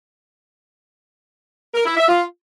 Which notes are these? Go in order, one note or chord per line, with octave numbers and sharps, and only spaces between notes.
A#4
E4
E5
F4